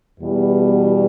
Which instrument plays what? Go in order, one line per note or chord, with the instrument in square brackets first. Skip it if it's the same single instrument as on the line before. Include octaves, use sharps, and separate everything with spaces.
[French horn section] E2 B2 G3